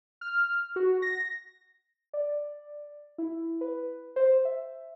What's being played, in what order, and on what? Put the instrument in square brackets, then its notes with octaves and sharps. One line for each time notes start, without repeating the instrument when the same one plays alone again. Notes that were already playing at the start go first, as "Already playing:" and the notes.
[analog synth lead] F6
F#4
A#6
[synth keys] D5
E4
B4
C5
E5